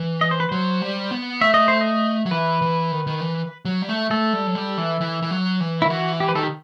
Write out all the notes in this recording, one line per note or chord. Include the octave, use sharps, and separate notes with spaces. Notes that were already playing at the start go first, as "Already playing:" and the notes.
Already playing: E3
D#5
C5
B4
F#3 C5
G3
B3
A3 E5
D#5
C5
D#5
F#3
E3 B4
E3
D#3
D#3
E3
F#3
G3
A3
A3 A4
G3
F#3
G3
E3
E3
E3
F#3
E3
D#3 E4
E3 F#4
G4
B4
D#3 A4
G4